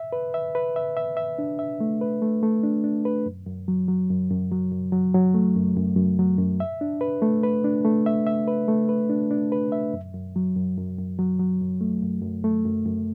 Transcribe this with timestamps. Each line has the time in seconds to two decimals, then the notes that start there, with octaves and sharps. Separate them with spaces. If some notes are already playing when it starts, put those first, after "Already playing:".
Already playing: E5
0.12 B4
0.34 E5
0.55 B4
0.76 E5
0.97 E5
1.17 E5
1.39 D4
1.59 E5
1.80 A3
2.01 B4
2.22 A3
2.43 A3
2.63 D4
2.84 D4
3.05 B4
3.26 F#2
3.47 F#2
3.68 F#3
3.88 F#3
4.10 F#2
4.31 F#2
4.51 F#3
4.71 F#2
4.92 F#3
5.14 F#3
5.34 A3
5.56 F#2
5.77 F#2
5.97 F#2
6.19 F#3
6.38 F#2
6.60 E5
6.81 D4
7.01 B4
7.22 A3
7.43 B4
7.64 D4
7.85 A3
8.06 E5
8.27 E5
8.48 B4
8.68 A3
8.89 B4
9.09 D4
9.31 D4
9.52 B4
9.72 E5
9.93 F#2
10.14 F#2
10.36 F#3
10.56 F#2
10.78 F#2
10.98 F#2
11.19 F#3
11.39 F#3
11.61 F#2
11.81 A3
12.02 F#2
12.22 F#2
12.44 A3
12.65 F#2
12.85 F#2